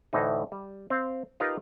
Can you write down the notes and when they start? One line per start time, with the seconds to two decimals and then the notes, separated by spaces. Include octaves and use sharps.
0.13 D2 A2 E3 D#4
0.52 G3
0.90 C4 F5
1.40 D#4 F4 G4 A#4 B4 F5